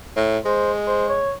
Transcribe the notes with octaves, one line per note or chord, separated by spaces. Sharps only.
A2
G#3 C5
C5
C#5